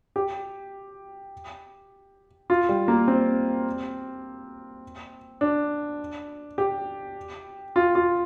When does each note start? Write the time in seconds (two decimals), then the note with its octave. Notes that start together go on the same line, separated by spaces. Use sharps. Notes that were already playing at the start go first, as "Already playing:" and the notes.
0.16 G4
2.50 F4
2.69 G3
2.88 A#3
3.08 C4
5.41 D4
6.58 G4
7.76 F4
7.95 F4